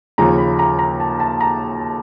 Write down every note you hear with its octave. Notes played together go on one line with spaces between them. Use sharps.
D#2 C#3 F3 A#5
B5
A#5
A#5
A5
A5
A#5